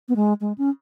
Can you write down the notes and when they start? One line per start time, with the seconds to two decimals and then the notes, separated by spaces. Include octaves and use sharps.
0.08 B3
0.16 G#3
0.41 G#3
0.58 C#4